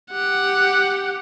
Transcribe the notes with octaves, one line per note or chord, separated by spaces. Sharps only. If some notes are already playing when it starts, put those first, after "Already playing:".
G4 F#5